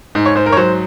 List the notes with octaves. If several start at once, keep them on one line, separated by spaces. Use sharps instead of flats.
G#2
C#5
G#2 C5
A#4
C#5
F#3 C5